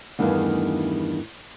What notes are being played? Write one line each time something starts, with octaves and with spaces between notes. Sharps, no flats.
E2 G2 D#3 A3 G#4 F5